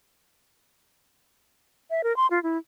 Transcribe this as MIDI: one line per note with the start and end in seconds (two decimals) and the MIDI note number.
1.90 2.02 76
2.04 2.15 70
2.16 2.27 84
2.31 2.41 65
2.43 2.58 64